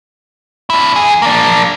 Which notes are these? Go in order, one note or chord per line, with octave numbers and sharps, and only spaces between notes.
D4 E4
E2 G#4
A#3 D4